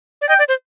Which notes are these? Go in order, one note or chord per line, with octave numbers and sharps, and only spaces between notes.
D5
D#5 G5
D5
C5